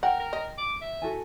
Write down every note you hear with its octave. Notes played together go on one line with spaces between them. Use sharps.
A#4 F#5 G5
A#4
D#5
D6
E5
F#4 A4 G#5